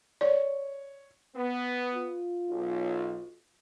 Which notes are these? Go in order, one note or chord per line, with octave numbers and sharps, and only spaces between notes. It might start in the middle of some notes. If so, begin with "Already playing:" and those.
C#5 D5
B3
F4
B1